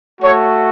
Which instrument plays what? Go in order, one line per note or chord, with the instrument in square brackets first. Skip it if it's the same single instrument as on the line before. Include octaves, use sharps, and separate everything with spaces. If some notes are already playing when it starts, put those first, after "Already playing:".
[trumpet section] A3 F#4 C#5